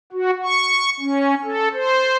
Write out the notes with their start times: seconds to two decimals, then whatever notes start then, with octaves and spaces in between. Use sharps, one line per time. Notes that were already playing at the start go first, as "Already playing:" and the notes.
0.12 F#4
0.43 C#6
1.00 C#4
1.45 A4
1.73 C5